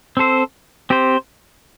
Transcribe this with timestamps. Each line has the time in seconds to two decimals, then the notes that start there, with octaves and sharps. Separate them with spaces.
0.17 C4 A4 C5
0.90 C4 G4 C5